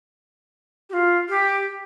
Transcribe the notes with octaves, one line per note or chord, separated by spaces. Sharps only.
G4
F4
G4
G4